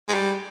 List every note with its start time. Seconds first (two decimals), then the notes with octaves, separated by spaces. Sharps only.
0.09 G#3
0.14 G3